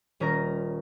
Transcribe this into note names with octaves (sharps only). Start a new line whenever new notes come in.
D#1 C#4 A#4 A#5 A#6